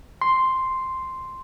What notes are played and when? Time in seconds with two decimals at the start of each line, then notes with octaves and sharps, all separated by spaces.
0.22 C6